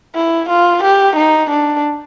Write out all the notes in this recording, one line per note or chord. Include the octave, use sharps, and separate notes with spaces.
E4
F4
G4
D#4
D4